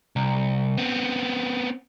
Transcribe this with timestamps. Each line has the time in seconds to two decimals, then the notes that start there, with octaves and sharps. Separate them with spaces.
0.16 C2
0.78 B3 C4